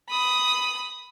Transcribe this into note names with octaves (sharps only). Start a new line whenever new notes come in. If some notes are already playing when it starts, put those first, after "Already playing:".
B5 D#6